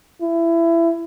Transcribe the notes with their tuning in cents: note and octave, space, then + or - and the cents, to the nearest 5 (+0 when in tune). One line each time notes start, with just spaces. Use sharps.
E4 +20